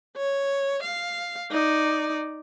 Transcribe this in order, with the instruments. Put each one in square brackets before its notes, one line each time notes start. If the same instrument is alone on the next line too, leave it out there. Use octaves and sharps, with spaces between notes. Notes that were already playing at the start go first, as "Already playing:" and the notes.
[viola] C#5
F5
D#4 D5